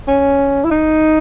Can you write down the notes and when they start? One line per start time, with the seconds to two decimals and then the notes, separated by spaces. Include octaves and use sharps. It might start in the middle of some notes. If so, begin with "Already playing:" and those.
0.08 C#4
0.64 E4
0.71 D#4